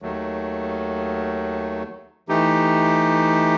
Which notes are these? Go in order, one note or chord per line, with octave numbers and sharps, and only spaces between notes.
D#2 D#3 F#3 A3
E3 A3 D#4 G4